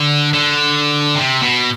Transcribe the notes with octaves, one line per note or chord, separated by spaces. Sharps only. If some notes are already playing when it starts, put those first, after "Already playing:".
Already playing: D3
D3
C3
B2